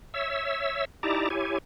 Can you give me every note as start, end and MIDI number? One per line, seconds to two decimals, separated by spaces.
0.14 0.85 73
0.14 0.85 76
0.14 0.85 88
1.03 1.29 63
1.03 1.29 64
1.03 1.29 67
1.03 1.29 74
1.03 1.29 81
1.03 1.29 82
1.30 1.58 64
1.30 1.58 67
1.30 1.58 73
1.30 1.58 80